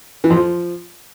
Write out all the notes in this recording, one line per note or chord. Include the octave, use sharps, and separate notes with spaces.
E3
F2
F3